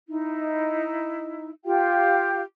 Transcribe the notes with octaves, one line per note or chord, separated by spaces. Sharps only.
D#4 E4
F4 G4 F5 G5